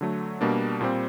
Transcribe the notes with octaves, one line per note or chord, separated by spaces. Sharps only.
D3 F#3 A3
B2 G3 A#3 D4
A#2 G3 C4